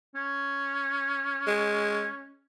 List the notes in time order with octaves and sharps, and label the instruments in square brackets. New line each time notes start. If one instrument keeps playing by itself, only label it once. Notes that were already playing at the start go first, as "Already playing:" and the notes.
[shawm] C#4
[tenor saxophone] G#3